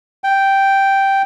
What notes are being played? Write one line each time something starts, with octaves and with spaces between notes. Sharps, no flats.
G5